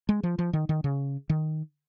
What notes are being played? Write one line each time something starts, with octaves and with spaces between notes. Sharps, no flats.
G#3
F3
F3
D#3
D#3
C#3
D#3